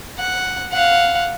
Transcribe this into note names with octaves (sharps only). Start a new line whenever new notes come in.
F#5
F5 F#5